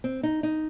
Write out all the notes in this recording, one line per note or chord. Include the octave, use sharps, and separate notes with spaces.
C4
D#4
D#4